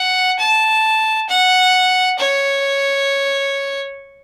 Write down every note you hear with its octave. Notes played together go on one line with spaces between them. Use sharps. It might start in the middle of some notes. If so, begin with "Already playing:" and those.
Already playing: F#5
A5
F#5
C#5